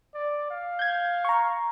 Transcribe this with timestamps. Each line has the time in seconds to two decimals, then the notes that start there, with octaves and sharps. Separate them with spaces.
0.14 D5
0.50 F5
0.79 G6 G#6
1.25 A#5 C#6